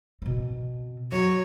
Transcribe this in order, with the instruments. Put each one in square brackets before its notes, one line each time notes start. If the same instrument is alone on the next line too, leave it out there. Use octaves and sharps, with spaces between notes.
[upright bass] B2 C4
[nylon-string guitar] F#3 [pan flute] F#4 [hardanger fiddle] C#5